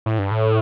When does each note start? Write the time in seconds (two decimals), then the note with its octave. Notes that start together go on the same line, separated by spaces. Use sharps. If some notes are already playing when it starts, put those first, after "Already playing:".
0.06 A2
0.19 G2
0.31 A2